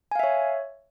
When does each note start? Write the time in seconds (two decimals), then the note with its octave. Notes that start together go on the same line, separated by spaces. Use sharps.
0.11 G#5
0.15 F5
0.19 E5
0.23 C#5